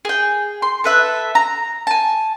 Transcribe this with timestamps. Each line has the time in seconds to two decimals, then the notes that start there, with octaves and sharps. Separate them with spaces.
0.05 G#4 G5
0.62 C6
0.84 A4 B4 E5
1.35 A#5
1.87 G#5 A5